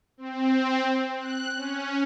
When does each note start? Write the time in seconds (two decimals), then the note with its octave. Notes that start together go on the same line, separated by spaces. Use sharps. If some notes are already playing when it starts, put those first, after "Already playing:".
0.18 C4
1.18 F#6
1.56 C#4